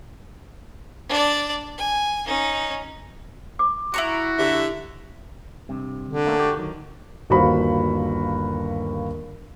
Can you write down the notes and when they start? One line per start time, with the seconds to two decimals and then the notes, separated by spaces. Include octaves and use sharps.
1.09 D4 D5
1.78 G#5
2.26 C#4 D#4
3.59 D6
3.94 E4 F#4 A#5 C#6
4.39 D3 G4 E5
5.69 G2 C3
6.07 D3
6.27 A3 A#3 C#4
6.40 F#4 G4
6.57 D#3 F#3
7.30 G1 D#2 F#4 C5 F5 B5